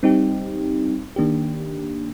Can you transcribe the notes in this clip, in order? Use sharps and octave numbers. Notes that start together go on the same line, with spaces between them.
G3 C4 D#4 G4
D#3 A#3 D4 G4